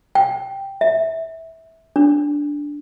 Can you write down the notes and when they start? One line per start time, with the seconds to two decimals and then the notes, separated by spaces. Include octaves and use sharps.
0.15 G5
0.81 E5
1.96 D4